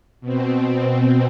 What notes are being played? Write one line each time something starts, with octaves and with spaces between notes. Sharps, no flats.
B2 C4